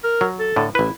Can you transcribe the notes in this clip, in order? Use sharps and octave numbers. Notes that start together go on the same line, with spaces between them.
A#4
F#3
A4
A2 D3
A1 E4 B4